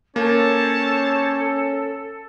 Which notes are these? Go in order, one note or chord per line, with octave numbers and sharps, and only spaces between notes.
A#3 C#4 A4 C5 C#5 A5